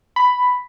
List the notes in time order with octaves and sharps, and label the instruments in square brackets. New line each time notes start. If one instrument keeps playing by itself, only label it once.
[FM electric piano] B5